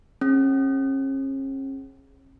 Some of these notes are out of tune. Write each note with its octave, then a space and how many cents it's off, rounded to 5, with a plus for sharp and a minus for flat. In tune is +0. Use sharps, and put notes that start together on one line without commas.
C#4 -40 G#4 +0